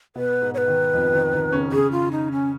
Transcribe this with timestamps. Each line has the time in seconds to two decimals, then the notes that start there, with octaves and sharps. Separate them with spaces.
0.16 B2 B3 B4
0.42 G#2 G#3
0.54 C#5
0.58 B4
0.68 D#3
0.94 F2 F3
1.14 D#3
1.33 D#3
1.52 C#3 C#4
1.72 C#3 C#4 G#4
1.92 F4
2.11 D#4
2.32 C#4